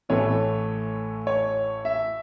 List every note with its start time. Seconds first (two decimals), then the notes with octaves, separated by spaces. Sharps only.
0.09 A1 A2 E3 A3 C#5
1.27 C#5
1.85 E5